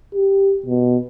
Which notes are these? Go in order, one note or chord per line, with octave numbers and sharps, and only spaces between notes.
G4
B2